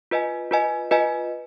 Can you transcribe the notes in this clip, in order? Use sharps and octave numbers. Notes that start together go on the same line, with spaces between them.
F4 B4 D#5 G#5
F4 B4 D#5 G#5
F4 B4 D#5 G#5